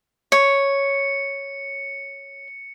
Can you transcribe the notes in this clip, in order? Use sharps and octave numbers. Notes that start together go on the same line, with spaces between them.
C#5 C#7